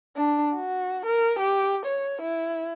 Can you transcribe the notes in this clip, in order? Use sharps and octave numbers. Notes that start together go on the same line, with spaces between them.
D4
F#4
A#4
G4
C#5
E4